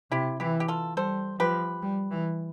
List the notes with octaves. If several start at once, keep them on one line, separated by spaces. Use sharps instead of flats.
C3 E4 G4
E3 E4 G4
G4
F4 A4
G3 A4 C5
F3 G4 B4
G3
E3